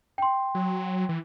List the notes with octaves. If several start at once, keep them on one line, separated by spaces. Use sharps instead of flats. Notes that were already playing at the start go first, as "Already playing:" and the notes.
G5 C6
F#3
E3